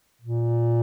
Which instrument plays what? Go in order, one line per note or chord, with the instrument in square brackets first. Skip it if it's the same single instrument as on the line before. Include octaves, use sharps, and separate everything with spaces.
[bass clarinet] A#2